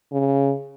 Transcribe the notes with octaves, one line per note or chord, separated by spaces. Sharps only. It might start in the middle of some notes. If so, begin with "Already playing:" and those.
C#3